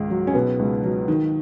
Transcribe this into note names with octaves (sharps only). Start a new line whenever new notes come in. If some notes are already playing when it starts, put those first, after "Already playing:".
Already playing: C#2 G#2 D#3
F#3
C#4
B2 B3
C#2
F#3
D#3